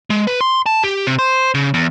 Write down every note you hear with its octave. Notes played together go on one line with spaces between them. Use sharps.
G#3
B4
C6
A5
G4
C3
C5
C#3
E2